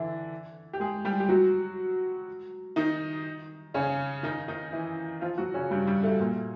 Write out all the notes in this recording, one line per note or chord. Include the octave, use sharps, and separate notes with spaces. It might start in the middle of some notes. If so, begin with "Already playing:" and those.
Already playing: D3 E3 D4 E4
G4
G#3 G#4
G3 G4
G4
F#3 F#4
D#3 D#4
C#3 C#4
D#3 D#4
D#3 D#4
E3 E4
F3 F4
F#3 F#4
C#3 C#4
G2 G3
G2 G3
A2 A3
A#2 A#3